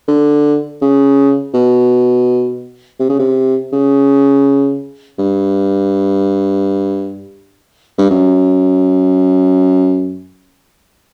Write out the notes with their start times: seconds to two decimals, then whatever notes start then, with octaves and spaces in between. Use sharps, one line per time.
0.08 D3
0.82 C#3
1.54 B2
3.00 C3
3.09 C#3
3.19 C3
3.73 C#3
5.19 G2
7.98 G2
8.10 F#2